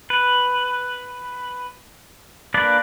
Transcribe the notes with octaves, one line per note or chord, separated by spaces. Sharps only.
B4
A#3 D4 B4 D5